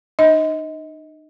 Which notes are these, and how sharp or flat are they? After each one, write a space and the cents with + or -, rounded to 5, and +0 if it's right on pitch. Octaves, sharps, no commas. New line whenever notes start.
D#4 -35 D#5 +25